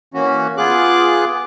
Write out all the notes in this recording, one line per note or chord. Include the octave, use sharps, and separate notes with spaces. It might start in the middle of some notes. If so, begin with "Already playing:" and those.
E3 A#3 C#4 F#4
B3 F4 G#4 D6 F#6